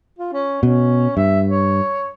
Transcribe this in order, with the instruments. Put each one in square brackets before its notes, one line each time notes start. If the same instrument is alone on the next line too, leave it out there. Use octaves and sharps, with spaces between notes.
[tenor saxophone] F4
C#4
[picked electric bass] B2 [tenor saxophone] C#4
[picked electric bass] G2 [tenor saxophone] E5
[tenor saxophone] C#5